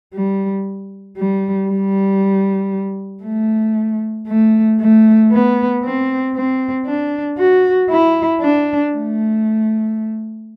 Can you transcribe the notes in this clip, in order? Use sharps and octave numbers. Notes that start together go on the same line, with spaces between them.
G3
G3
G3
A3
A3
A3
B3
C4
C4
D4
F#4
E4
D4
A3